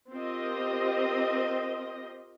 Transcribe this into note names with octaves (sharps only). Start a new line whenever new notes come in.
C4 F4 G4 A#4 D#5